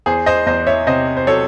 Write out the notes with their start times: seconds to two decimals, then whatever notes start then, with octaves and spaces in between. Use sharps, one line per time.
0.06 E2 G#4 C5
0.26 C5 D#5
0.46 E2 C5 D#5
0.67 C#5 E5
0.87 C3 C5 D#5
1.17 C5
1.27 F#3 A4 C#5